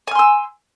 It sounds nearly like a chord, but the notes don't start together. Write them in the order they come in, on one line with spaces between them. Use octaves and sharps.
G#5 F6 C6 E6